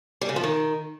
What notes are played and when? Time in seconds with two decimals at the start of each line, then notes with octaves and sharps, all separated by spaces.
0.21 G3
0.29 C#3
0.36 F3
0.43 D#3